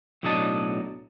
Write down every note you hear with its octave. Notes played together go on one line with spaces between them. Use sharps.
B1 A2 F#3 D4 D#5 A5